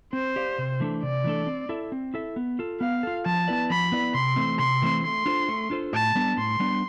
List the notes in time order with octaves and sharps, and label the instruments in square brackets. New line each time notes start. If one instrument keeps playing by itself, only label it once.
[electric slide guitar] C4 [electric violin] C5
[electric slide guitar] G4 D5 F5
C3
E3 A3 D4 A4
[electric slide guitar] C3 [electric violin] D5
[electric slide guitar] E3 A3 D4 A4
C4
E4 A4 E5
C4
E4 A4 E5
B3
F4 A4
[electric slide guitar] B3 [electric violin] F5
[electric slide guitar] F4 A4
[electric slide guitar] F3 [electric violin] A5
[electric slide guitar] B3 E4 B4 D5
[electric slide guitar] F3 [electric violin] B5
[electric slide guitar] B3 E4 B4 D5
[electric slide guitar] C3 [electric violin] C6
[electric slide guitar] E3 A3 C4
[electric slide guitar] C3 [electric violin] C6
[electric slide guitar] E3 A3 C4
[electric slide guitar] A3 [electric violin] C6
[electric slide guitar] D4 F4 A4 C5
A3
D4 F4 A4 C5
[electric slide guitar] A2 [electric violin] A5
[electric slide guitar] G3 B3 D4
[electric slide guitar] A2 [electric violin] C6
[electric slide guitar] G3 B3 D4